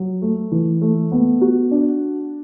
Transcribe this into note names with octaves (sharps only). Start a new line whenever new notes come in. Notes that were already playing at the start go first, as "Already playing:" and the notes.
Already playing: F#3
A3
E3
A3
B3
F#4
D4